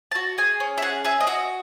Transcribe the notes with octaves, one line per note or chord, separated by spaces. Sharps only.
A5
F#4
G#4 G#5
C#4
E5
G#4 F#5
G#4 E5
D#5
F#4 E5